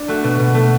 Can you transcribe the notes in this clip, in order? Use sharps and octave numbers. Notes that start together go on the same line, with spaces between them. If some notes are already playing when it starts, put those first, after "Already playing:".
Already playing: D4
A3 F#4
B2
B2
A3